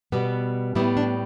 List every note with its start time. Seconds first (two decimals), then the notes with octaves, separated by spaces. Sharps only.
0.12 B2 G3 B3
0.75 A2 G3 B3 E4
0.97 D4